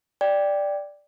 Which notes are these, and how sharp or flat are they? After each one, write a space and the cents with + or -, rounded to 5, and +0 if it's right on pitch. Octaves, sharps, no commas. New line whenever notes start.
D5 +0 G5 +5